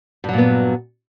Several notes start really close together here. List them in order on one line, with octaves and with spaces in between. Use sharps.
G2 F#3 A#2 B3